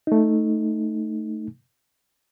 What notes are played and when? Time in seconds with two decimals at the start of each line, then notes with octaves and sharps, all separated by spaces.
0.07 A3 D#4